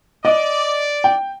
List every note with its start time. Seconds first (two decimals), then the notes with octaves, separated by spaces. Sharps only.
0.25 D5 D#5
1.04 G5